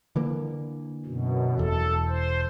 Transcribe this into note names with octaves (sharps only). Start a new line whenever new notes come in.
D3 E3 A#3
F#2 B2
E1 E2 A4
C5